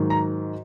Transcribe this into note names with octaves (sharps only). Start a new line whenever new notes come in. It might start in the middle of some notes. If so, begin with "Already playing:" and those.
Already playing: G#2 D#3 F#3
A#5